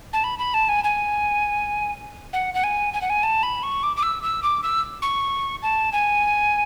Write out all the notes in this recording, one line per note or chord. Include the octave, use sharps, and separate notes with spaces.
A5
B5
B5
A5
G#5
G#5
F#5
F#5
G#5
G#5
F#5
G#5
A5
B5
C#6
D6
D6
E6
E6
D6
E6
C#6
A5
G#5